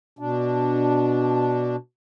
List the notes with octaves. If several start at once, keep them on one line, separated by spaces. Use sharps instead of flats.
B2 D4